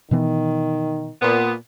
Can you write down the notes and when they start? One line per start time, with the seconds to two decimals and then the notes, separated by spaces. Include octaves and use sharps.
0.11 B2 D#3 E3 B3
1.21 A#2 B3